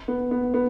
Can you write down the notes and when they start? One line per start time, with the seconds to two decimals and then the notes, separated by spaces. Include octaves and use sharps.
0.08 B3
0.31 B3
0.54 B3